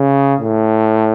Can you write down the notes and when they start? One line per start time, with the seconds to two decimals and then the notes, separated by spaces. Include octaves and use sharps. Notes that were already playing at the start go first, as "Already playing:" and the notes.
Already playing: C#3
0.41 A2